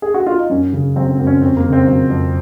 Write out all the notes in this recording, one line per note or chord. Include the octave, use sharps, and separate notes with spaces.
G#4
F#4
F4
D#4
F#2 C#4
C#3
F#3 C4
C4
F#2
C#4
F2 C4
A#3
C#3
C4
F#3
F2